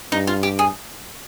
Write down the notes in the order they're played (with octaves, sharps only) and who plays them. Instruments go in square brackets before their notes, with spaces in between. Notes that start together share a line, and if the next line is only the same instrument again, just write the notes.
[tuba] G2 [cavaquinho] D#4
[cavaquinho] F4
G4
G#4